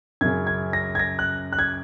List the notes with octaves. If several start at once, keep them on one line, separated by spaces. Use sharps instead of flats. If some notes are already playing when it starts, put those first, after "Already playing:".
F#2 C#3 G#6
G#6
A#6
G#6
A#6
F#6
F#6
G#6